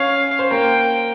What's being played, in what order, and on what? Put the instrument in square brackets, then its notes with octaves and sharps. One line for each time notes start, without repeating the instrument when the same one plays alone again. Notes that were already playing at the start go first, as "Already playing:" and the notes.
Already playing: [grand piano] C#4 C#5 [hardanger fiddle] F5
[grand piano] C5
[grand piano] A#3 A#4 [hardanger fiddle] G5